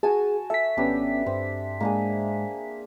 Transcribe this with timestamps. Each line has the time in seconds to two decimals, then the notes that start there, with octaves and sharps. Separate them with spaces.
0.03 F#4 G#4 G#5 A5
0.50 A4 E5 B6
0.77 G#1 B3 C#4 D4 G4 B4
1.26 G2 C4
1.80 G#2 G#3 A#3 D4 G#4